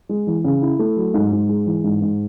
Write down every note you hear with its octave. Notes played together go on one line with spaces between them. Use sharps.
G#3
E3
C#3
E4
A3
F#3
G#2
G#2
G#3
E3
G#2
G#2